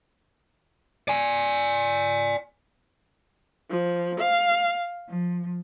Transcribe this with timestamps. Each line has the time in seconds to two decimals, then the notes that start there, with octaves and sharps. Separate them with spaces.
1.08 D5 G#5
3.70 F3
4.20 F5
5.08 F3